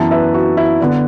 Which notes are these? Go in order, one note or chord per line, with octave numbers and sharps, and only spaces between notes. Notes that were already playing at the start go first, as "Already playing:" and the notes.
Already playing: F#2 E3 B3 E5 A5
B4 E5
F#4
E4
D3 B3 D4